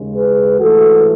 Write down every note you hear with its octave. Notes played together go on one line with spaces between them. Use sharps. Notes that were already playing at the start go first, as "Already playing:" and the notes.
Already playing: D#2 C#3 G#3
G#4 B4
G#2 E3 A3 F#4 A4